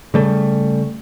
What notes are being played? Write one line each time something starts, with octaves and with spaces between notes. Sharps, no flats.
C#3 G3 A3